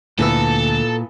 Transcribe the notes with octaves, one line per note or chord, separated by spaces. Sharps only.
D2 A#2 E3 B3 A4 E6